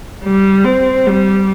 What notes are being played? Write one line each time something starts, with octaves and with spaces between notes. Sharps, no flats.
G3
C4
G3